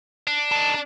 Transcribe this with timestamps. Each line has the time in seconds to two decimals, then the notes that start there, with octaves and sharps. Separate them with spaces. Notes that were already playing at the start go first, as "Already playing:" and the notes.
0.27 D4
0.52 D#4 A4